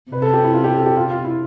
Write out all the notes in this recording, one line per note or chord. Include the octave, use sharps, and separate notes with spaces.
C3 B4
A4
G4
E4
F4
G4
A4
G4
F4
F4
E4